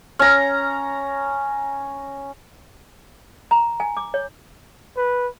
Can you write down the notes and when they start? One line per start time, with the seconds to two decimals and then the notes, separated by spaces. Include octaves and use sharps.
0.19 C#4 A#5
3.51 A#5
3.80 G#5
3.97 D6
4.14 C#5
4.97 B4